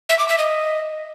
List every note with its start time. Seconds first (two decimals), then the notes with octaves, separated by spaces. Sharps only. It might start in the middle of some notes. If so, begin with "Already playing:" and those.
0.09 E5
0.19 D6
0.29 E5
0.38 D#5